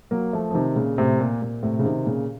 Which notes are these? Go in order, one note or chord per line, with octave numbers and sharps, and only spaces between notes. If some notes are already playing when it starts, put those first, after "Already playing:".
F#3 A#3
F3 A3
F3
C3 D#3
A#2 C#3
A2 C3
A#2
A#2
A2 C3
C#3
C3 D#3
A#2 C#3